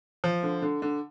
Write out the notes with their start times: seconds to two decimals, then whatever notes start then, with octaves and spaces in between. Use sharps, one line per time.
0.24 F3
0.43 D3
0.62 D3
0.82 D3